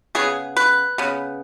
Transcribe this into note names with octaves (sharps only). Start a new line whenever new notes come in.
C#3 B3 G#4
B4
C#3 B3